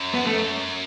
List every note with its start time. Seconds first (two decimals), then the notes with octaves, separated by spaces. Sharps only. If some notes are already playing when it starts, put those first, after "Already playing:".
Already playing: F#2
0.14 B3
0.27 A3